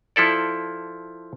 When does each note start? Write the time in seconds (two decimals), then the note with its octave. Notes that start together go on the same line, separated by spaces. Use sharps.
0.16 F3 E4 A4 D5